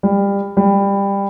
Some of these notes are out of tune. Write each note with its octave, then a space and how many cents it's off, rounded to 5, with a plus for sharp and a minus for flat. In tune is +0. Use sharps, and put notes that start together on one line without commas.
G3 +25
G3 +20